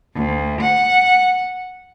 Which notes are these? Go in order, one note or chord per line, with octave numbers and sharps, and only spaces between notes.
D2
F#5